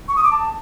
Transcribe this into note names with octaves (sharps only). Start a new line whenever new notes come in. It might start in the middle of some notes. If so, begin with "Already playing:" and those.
C#6
D#6
D6
A5